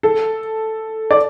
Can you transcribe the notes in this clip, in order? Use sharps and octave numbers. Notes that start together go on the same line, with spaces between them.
A4
D5